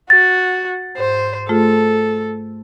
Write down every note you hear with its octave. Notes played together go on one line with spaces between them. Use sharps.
F#4 A6
G#2 C5
A3 F4 G#4 A4